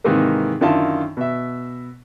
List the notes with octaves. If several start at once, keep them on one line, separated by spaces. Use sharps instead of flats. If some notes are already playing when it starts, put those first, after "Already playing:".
G#2 C3 D#3 E3 A#3
F#2 D3 D#3 E4 F4 A5
B2 E5